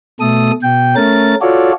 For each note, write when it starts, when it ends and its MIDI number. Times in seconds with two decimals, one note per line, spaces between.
0.20 0.52 47
0.20 0.52 57
0.20 0.52 69
0.20 0.52 87
0.63 0.95 47
0.63 0.95 79
0.96 1.35 57
0.96 1.35 61
0.96 1.35 70
0.96 1.35 93
1.42 1.73 65
1.42 1.73 66
1.42 1.73 69
1.42 1.73 73
1.42 1.73 74